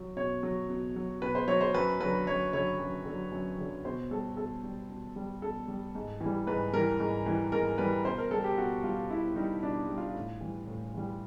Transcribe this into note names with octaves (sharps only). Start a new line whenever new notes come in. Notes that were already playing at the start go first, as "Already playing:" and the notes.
Already playing: F#3
B2 C#5
F#3
B2
F#3
B2 B4
C5
F#3 C#5
C5
F#2 B4
F#3 B4
D3
F#2 C#5
D3 F#3 C#5
F#2
D3 F#3
F#2
D3 F#3
B2 C5
G3 A4
B2 A4
G3
B2
G3
B2 A4
G3
G#2
E3
G3
G#2 B4
E3 G3 A#4
G#2
E3 G3
G#2 A#4
E3 G3 B4
B2 C5
A#4
G3 A4
G4
B2 F#4
G3 F4
B2 E4
G3 D#4
B2 D4
G3
F4
A2
E3 G3
A2
E3 G3